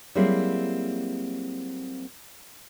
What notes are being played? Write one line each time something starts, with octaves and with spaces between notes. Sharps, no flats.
F#3 G3 A#3 C4 E4 G#4